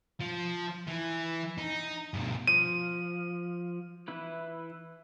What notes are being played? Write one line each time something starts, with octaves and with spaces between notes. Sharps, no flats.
F3
E3
D#4
G2 B2
F3 D#7
E3 E4 B4